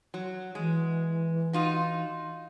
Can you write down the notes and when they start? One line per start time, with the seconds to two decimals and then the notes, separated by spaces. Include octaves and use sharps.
0.14 F#3
0.55 E3 G#3
1.53 D#4 F4 F#4